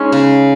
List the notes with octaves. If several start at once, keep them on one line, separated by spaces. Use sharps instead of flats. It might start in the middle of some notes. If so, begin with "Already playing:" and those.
Already playing: G#3 C#4 D#4
C#3